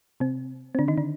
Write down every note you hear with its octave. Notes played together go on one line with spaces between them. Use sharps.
C3 C4
C4
D3 D4
D#3 D#4
D3 D4